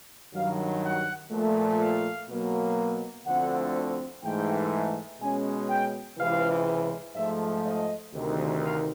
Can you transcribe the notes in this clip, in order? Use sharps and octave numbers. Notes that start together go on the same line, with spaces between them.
G2 D#3 F#3 F5
F#5
A#2 F3 A3
F5
B2 F#3 A#3
D2 D3 F3 A3 C4 F#5
G#2 E3 A3 G5
B2 G#3 C#4 G#5
G5
C#2 C3 E3 F5
G#2 F3 A3 E5
D#5
D2 C3 D#3
F5